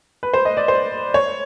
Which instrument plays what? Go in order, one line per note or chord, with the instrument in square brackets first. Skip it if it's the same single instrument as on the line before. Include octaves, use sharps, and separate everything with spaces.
[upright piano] B4
C5
D#5
D5
C5
C#5